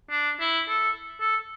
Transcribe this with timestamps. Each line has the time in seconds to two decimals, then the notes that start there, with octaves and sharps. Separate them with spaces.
0.10 D4
0.40 E4
0.69 A4
1.21 A4